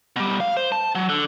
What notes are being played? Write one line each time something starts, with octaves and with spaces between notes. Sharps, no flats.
B2 G3
F5
C5
A5
F#3
D3